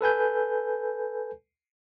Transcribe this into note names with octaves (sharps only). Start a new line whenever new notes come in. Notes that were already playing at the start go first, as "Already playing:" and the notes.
A4 B4 G#5 G6